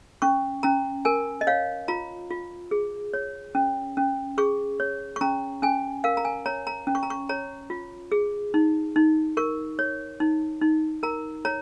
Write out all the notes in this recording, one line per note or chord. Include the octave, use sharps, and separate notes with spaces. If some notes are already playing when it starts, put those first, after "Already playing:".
C#4 C#6
C#4 A#5
A#4 G#5
D#5
C#5 F5
F4 A#5
F4
G#4
C#5
C#4
C#4
G#4 C#6
C#5
C#6
C#4 A#5
C#4 G#5
A#4 F5
A#5
G#5
C#5 A#5
A#5
C#4
C#6
A#5
C#6
C#5 A#5
F4
G#4
D#4
D#4
A#4 C#6
C#5
D#4
D#4
A#4 A#5
C#5 A#5